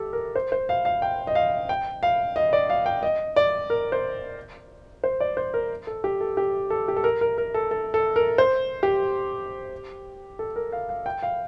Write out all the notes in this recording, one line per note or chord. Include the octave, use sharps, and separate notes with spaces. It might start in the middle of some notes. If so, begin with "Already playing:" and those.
Already playing: G4 A4
A#4
C5
C5
F5
F5
G5
D#5
F5
G5
F5
D#5
D5
F5
G5
D#5
D5
A#4
C5
C5
D5
C5
A#4
A4
G4
A4
G4
A4
G4
A4
A#4
A#4
A#4
A4
A4
A4
A#4
C5
G4
A4
A#4
F5
F5
G5
F5